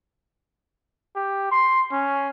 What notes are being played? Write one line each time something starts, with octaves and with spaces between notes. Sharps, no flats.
G4
C6
C#4